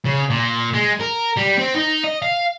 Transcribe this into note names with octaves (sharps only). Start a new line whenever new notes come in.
C#3
A#2
G#3
A#4
G3
C4
D#4
D#5
F5